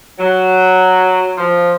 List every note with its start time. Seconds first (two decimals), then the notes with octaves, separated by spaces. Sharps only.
0.18 F#3
1.38 F3